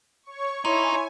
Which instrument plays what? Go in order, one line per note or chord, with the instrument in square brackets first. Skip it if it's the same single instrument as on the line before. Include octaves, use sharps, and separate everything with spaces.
[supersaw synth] C#5 C#6
[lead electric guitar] D#4 [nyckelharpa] E4 C#5 [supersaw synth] G#5 [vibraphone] C6